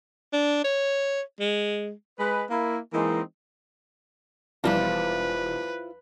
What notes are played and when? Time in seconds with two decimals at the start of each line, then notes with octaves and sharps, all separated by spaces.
0.33 D4
0.64 C#5
1.40 G#3
2.19 G#3 B4
2.50 A#3 E4
2.94 E3 G#3 A#3 C4 D#4
4.64 E1 E2 F3 G3 E4 F4 B4 C5